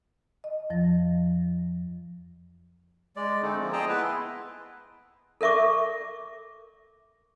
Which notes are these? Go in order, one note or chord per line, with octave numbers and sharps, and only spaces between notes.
D#5
F2 F3 A#6
G#3 D5
D3 G#3 A3 C4 D#4
F3 A#3 C4
G#4 D#5 G5 A5 A#5
B3 E4 B4
C6
A4 A#4 E5 C#6 D6